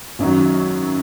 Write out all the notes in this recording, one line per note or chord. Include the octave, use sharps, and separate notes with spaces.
G#1 F#2 D#3 F#3